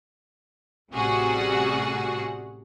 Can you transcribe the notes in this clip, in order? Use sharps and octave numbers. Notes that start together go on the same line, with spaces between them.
A1 C3 G3 F#4 G#4 F#5